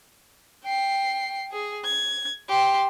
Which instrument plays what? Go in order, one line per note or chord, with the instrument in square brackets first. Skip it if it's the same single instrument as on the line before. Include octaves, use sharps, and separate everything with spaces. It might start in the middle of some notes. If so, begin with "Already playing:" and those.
[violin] G5 C7
G#4
G#6
G4 C6